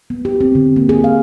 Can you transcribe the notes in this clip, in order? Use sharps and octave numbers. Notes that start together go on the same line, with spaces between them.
B3
G4
C4
D3
A#3
G#4
F5